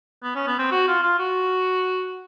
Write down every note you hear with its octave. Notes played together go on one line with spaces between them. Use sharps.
B3
C#4
B3
C4
F#4
F4
F4
F#4